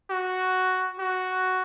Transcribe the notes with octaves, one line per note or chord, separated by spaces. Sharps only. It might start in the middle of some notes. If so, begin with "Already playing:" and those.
F#4
F#4